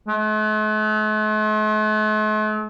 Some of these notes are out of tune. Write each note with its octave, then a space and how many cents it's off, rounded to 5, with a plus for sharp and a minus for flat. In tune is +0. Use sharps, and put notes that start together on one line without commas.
A3 -45